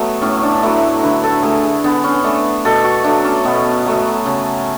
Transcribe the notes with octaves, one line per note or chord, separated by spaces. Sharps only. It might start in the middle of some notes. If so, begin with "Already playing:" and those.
Already playing: F#3 A3 B3
A2 C#4
D4
F#3 A3 E4
D3 B4
A4
A3 G#4
G#4
D3 B3
C#4
A3 D4
B2 A4
F#4
F#3 A3 D4
C#4
B2 B3
F#3 A3
C#3